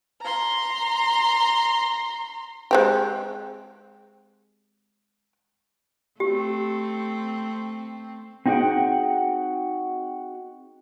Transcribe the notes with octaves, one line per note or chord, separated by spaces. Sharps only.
A#5 C6
G#3 C4 G4
A3 C4 G4
C4 D#4 F#4 G#4 F#5 G5